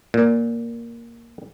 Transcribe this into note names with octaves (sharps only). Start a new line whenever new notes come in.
A#2